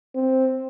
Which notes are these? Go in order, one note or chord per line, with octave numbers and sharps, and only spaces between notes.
C4